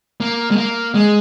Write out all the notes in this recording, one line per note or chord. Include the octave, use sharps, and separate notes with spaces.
A#3
G#3
A#3
G#3